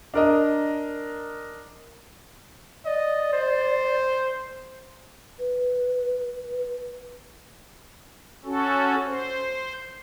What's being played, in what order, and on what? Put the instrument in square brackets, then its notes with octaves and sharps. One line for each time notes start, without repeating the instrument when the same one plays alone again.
[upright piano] D4 A#4 D#5
[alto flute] D5 [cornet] D#5
[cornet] C5
[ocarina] B4
[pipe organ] C#4 F#4 A4
C5